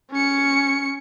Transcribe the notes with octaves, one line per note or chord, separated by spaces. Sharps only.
C#4 C#7